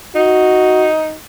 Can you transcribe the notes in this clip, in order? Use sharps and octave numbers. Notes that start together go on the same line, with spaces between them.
D#4 F#4